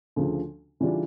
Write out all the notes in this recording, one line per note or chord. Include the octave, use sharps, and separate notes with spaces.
D2 C#3 F3
C#3 E3 G3 D4 F4